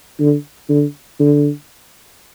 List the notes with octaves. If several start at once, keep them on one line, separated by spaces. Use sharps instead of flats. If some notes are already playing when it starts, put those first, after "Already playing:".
D3
D3
D3